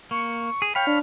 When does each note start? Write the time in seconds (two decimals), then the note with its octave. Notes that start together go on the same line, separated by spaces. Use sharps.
0.11 A#3 C#6
0.62 G#4
0.75 C#5 F5 G5 B5
0.87 D4